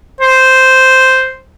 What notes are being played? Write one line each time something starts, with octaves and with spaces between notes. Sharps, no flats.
C5